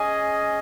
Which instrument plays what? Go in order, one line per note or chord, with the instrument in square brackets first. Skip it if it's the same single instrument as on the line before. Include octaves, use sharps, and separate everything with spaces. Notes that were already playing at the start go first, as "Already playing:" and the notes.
Already playing: [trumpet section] C#4 G#4 D#5 [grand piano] G#5